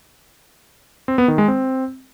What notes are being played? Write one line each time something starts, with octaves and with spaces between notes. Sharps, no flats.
C4
B3
D#3
G#3
C4